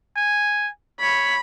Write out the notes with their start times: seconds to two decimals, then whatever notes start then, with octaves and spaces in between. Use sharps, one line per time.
0.17 G#5
1.00 C#5 B5